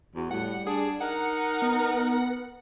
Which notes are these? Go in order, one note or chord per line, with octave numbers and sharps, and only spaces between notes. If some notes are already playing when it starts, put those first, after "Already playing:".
E2 F#4
A2 G3 F#5
D4 G#4
D#4 A#4 F#5
B3